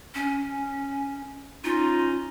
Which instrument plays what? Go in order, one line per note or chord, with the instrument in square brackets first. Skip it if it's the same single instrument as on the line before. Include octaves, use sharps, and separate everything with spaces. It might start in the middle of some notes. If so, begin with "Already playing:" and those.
[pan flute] C#4
[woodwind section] C#4 D#4 [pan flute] F4